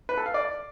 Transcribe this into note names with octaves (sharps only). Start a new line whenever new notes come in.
B4
A4
F5
D5